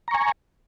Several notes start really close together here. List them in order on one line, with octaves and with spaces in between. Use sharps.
A#5 C#6 G#5